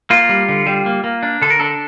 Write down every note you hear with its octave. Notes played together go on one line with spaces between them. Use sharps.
A#3 F4
G3
D3
G3
A#3
A#3
D4
D3 A4
A#4
D4 A4